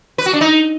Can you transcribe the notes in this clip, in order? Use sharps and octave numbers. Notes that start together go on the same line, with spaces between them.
B4
F#4
D4
D#4